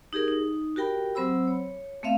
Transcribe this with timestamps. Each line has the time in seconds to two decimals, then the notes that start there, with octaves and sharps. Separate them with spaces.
0.13 D#4 G4 G#4 A#4
0.28 D#4
0.76 F#4 G4 A#4 G5 B5
1.15 F#3 C4 C5 B5 E6
1.48 C#5
2.03 A3 B3 C4 E5 F5